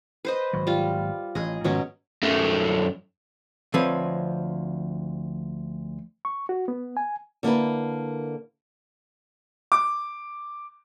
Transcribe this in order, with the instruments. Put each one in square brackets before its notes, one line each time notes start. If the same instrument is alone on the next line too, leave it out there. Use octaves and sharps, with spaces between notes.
[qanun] B4 C5 D#5
[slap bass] G#1 F#3
[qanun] G3 F4
[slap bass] A1 [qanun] G#4 D#5
[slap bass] G#2 D#3 F3 [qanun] B2 F#3 C#4
[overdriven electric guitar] F#2 A3
[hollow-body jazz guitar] D2 F3 C4 B4 C#5
[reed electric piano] C#6
F#4
B3
G#5
[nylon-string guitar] D3 A#3 E4 A#4 B4
[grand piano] D6